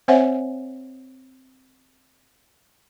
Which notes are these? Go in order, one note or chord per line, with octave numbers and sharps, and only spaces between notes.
C4 C5 C#5 E5 F#5 G#5